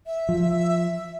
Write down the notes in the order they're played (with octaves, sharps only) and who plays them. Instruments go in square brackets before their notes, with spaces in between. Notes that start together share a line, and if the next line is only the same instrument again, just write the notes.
[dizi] E5
[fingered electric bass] F3